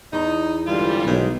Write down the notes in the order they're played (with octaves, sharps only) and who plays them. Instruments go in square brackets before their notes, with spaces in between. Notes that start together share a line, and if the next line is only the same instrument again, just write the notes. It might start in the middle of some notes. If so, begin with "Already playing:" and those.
[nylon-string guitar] E2 [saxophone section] D#4
[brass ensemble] G1 E3 G3 [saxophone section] G#2 F4
[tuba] B1 [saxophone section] G#2 D#3